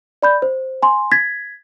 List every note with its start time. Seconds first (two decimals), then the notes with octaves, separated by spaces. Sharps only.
0.22 D5 B5 G6
0.42 C5
0.82 G#5 C6
1.12 G#6 A6 B6